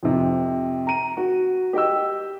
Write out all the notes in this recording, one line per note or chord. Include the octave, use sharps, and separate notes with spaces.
F2 C3
A#5 D#7
F#4
G4 D#5 G5 E6